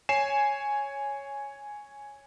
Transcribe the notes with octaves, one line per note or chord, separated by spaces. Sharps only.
C#5 G#5 C7 E7